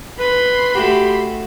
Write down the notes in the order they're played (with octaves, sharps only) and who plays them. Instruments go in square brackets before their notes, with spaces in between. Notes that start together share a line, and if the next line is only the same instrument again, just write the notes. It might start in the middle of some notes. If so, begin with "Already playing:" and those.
[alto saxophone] B4 [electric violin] B5 C6
[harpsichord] A3 F#4 [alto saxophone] G4